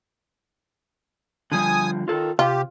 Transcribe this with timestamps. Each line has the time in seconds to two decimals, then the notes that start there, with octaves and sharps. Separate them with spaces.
1.52 D3 F3 G3 G#5 D#6
2.08 D#3 F4 A4 A#4
2.39 C3 F4 G4